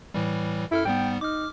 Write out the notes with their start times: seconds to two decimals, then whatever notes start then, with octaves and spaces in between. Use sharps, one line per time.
0.14 A2 E3 G3
0.72 F#2 E4 A4 F6
0.85 G#2 G3 B3 G5
1.21 D#4 D6 F6